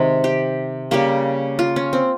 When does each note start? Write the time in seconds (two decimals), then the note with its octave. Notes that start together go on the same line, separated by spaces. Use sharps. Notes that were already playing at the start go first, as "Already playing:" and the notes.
Already playing: C3 D#3 G#3
0.24 G4
0.91 C#3 G3 A#3 G4
1.59 F4
1.76 C#4
1.93 C4